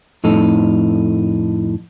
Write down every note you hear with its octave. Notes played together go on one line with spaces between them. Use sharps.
F2 A2 D#4 A4